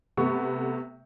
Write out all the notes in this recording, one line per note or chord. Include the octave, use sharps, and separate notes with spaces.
C3 A3 B3 C#6